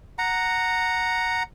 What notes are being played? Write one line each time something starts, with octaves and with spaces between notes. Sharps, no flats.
F#5 A#5